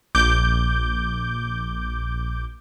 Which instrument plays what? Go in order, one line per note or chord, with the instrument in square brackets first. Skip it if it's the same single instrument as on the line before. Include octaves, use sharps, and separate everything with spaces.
[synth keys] A#1 D6 G6